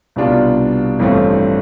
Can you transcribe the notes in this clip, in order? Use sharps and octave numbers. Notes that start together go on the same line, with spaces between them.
C2 B2 G3 D4 F4
A1 G2 F3 A3 C4